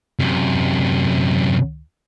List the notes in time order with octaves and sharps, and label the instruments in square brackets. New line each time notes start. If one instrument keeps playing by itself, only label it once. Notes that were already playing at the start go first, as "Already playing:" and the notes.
[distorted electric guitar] F#2 C3